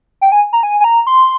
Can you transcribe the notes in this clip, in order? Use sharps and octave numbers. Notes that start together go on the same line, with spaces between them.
G5
G#5
A#5
G#5
G#5
A#5
C6